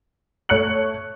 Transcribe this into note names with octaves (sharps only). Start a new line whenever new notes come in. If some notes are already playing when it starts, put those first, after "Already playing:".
A3 C#5 F#6 C#7 F#7